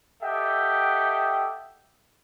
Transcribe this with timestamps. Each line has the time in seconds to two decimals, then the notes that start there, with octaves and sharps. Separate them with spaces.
0.23 G4 A4 D#5 E5 F#5 G5